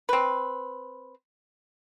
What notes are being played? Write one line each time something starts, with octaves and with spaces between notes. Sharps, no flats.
C4 B4